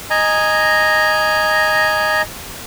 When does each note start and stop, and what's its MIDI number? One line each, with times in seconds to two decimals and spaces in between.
0.10 2.22 75
0.10 2.22 80
0.10 2.22 82